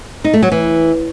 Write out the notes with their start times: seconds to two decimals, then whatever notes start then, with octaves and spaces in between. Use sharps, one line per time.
0.24 D#4
0.33 A3
0.43 F#3
0.52 E3